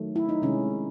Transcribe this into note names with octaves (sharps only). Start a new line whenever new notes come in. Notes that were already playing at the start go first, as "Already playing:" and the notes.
Already playing: D#3 F#3 A3
E4
D#4
C3 D#3 G#3 C#4